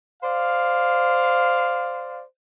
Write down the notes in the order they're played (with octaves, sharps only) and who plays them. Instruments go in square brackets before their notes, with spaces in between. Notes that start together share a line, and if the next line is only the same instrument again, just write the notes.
[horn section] C5 D5 F5